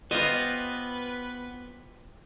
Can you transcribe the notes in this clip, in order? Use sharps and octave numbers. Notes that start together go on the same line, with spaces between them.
B3 F4 G4 B4 C5 D#5